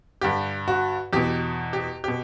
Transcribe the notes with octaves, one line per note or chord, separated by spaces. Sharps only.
G2 D3 G4
F#4
E2 B2 G4
G4
B2 G4